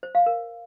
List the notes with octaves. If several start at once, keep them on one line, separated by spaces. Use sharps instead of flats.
C5
F5
A#4